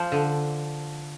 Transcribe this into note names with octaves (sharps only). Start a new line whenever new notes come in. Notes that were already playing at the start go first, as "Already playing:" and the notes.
Already playing: F3
D3